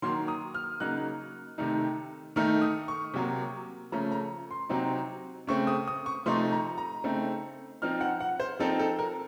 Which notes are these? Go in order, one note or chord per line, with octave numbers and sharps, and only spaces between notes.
D#3 F#3 A#3 C6
D#6
F6
C#3 F#3 A#3 D#4 F#6
C3 D#3 A3 D#4
D#3 A3 D#4 F6
D#6
C#6
C3 F#3 A#3
C#3 F3 A3 C#4 A#5
A#5
C6
C3 F#3 C4 D#4
C#3 A3 C4 C#6
D#6
D#6
C#6
C3 F3 A3 D#4 C6
A#5
A#5
C#3 A3 C4 D#4
F3 C4 D#4 F6
F#5
F#5
C5
F3 C4 D#4 A4
A4
A#4